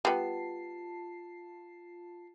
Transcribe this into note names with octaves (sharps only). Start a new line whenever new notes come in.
G3 B3 F4 A5 C7